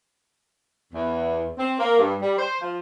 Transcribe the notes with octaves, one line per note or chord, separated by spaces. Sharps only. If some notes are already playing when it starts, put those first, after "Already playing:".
E2
C4
A#3
G2
G3
C5
F3